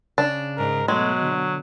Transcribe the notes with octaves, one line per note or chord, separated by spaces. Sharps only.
C#3 D4
G#2 A#4
B2 F#3 G#3 A3
D3